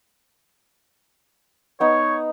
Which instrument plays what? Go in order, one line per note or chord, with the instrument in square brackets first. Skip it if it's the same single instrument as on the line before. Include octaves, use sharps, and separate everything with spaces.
[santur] B3 D#4 [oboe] C#5